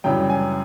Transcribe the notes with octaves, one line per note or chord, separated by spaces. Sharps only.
F#2 C#3 E3 G3 G5
G#5